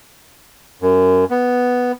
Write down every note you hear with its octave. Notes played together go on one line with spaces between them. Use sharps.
F#2
B3